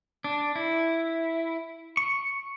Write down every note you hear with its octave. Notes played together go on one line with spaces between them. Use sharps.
D4
E4
C#6